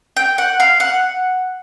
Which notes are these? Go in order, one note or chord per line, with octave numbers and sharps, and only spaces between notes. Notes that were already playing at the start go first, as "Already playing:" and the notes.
G5
F#5
F5
F#5